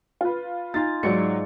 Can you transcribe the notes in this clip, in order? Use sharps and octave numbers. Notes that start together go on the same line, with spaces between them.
F4 B4
D#4 F4 G#5 A6
G#2 F#3 D5 C#7